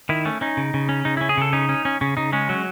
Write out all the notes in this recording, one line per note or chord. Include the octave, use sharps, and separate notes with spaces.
D#3 E4
A3 C#4
C#4 D#4
C#3
C#3
C#4
C#3 D#4
C#4 E4
G#4
C#3 A4
C#4 D#4
C#4
C#4
C#3 C#4
C#3 D#4
G#3 C#4
F#3